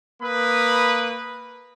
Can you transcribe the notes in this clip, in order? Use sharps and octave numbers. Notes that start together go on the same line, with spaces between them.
A#3 B4 B5 D#6